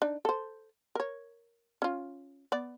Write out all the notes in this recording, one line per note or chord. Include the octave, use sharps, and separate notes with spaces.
D4 D#4
A4 C5
A#4 C#5
C#4 F4
B3 D5